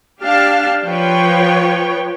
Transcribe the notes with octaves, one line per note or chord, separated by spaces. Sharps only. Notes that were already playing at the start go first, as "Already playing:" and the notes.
D4 G4 F5 A5
F3 B4 C#5 G5